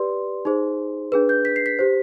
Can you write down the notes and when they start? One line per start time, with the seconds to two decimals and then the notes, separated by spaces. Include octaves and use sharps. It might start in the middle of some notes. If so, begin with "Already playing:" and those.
Already playing: G4 B4 D5 C6
0.45 D#4 G#4 C5
1.12 D4 G#4 B4
1.29 G6
1.45 B6
1.56 C7
1.66 B6
1.79 G4 C5